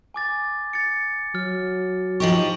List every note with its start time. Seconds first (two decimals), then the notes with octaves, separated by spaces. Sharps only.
0.14 G#5 D6 A6
0.73 A6 C#7
1.35 F#3 F6
2.20 F3 D#4 G4 C#6 F#7